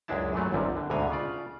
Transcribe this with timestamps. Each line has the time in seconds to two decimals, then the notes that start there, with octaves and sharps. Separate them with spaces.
0.08 C#2 F#2 G#3 D4 E4 A5
0.33 F#2 A#2 E3 F#3 A3
0.52 G1 C2 F#2 C3 G3
0.77 D3
0.90 D2 G#2 B2 D3 F5 G#5
1.10 C#3 F4 D5